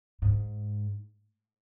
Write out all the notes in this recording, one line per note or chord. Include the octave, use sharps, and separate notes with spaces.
G#2